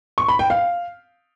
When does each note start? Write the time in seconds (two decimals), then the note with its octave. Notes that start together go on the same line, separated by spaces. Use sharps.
0.18 C#6
0.28 B5
0.39 G5
0.50 F5